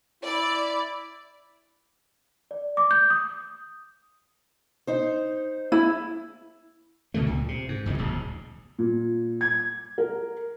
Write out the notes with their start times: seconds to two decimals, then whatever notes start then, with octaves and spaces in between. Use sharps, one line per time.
0.24 E4 D5
2.51 D5
2.77 D6
2.91 G6
3.10 D#6
4.87 D#4 C5
5.72 E4
7.14 C2 B2 D3 A3
7.26 C#2 A#2
7.48 C3
7.69 G#2
7.86 F#1 C#2 C#3 G#3
7.98 D1 A#1 G#2
8.79 A#2
9.41 G#6
9.98 A#4